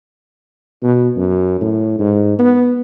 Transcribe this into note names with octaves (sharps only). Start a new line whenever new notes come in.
B2
F#2
A2
G#2
B3